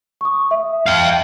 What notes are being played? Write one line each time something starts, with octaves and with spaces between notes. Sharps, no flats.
C#6 D#6
E5
F5 G5 F6